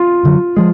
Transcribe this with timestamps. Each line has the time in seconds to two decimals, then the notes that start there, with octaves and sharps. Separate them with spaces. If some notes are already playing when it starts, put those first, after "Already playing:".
Already playing: F4
0.23 F#2 D3 F#3
0.57 F3 G#3